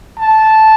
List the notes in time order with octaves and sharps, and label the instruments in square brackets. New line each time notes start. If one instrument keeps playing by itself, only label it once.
[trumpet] A5